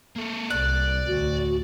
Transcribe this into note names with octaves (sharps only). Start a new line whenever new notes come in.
A#3 A4
C2 D5 F#6
D2 A2 F#4